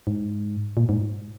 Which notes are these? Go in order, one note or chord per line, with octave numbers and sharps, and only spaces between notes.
G#2
A#2
G#2